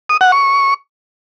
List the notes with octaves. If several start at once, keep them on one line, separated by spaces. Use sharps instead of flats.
D#6
F#5
C#6